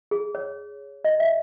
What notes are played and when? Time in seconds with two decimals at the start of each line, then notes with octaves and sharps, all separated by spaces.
0.11 G#4
0.35 C#5
1.04 D#5
1.20 E5